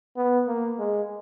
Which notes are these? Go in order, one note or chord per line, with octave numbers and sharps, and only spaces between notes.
B3
A#3
G#3